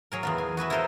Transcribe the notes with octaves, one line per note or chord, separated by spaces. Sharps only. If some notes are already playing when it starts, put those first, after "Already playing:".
F#3 G#4 A#4
E2 B3 F4
G#5
F#4 G#4 B4 E5
E4 F4 A4 A#4 C5 D#5